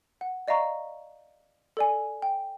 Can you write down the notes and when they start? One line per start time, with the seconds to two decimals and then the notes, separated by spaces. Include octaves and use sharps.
0.21 F#5
0.48 D5 D#5 F5 A#5 C#6
1.77 A4 D5 G#5
2.22 G5